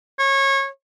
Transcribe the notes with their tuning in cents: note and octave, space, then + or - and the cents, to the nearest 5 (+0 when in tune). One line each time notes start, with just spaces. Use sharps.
C#5 -25